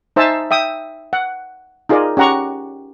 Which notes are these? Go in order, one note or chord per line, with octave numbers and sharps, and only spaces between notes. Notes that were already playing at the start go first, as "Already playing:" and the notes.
D#4 C5 E5 G#5 A5 E6
E5 G5 D#6
F#5
D#4 F4 G#4 A#4 D5 D#5
C#4 G4 F#5 A#5 C#6